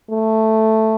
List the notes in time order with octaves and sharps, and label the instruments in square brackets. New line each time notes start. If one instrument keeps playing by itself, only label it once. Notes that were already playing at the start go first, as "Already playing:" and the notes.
[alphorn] A3